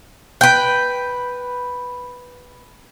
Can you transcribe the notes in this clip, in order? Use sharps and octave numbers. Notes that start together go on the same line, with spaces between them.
B4 G5